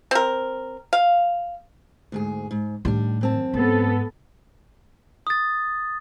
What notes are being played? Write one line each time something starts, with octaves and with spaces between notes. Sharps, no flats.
C4 A#4
F5
D2 G#2 G#4
G#2
A2 D#3 G3 D4
F#2 C4 A5
G#2 B3 A4
D#6 A6